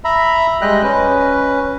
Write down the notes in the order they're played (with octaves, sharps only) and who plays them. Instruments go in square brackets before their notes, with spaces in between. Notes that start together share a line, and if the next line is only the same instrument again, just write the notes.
[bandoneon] E5 A#5 B5
G3 G#3 D#5 G5 F#6
C#4 B4